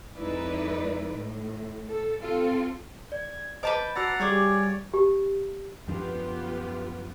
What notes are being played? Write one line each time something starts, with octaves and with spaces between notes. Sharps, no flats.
F2 G#3 D#4 E4 B4 D5
A2
A4
C4 F4 A4
D5 G#6
B4 C5 D#5 A5 D6 G6
F#4 D5 F#5 A#5 E6 A6 C7
G3 G4 G#4 C#5 D5 F5
G4
F#2 F3 B3 D4 F4 G4